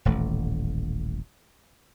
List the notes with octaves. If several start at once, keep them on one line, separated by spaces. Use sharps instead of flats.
D#1 A1 A3